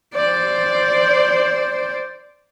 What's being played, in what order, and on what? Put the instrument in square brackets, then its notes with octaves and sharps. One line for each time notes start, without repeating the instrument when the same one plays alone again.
[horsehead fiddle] C5 D5